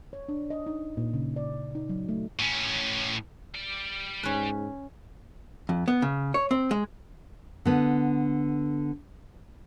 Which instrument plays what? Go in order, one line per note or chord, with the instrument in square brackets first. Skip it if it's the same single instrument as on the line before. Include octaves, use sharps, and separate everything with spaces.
[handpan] C#5
D4
D#5
D#4
A#2
C#3
D5
D#4
F#3
A3
[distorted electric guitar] A2 C#4
G3 D5
[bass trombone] G#2 [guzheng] C#4 B4
[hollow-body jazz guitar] F2
B3
C#3
C#5
C4
G#3
[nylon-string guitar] D3 B3